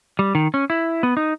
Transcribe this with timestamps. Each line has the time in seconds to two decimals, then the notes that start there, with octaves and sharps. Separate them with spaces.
0.19 G3
0.35 D#3
0.54 C#4
0.70 E4
1.03 B3
1.17 D#4